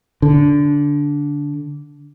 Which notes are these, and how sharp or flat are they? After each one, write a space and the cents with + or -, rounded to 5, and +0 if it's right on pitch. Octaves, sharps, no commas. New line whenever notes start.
D3 -15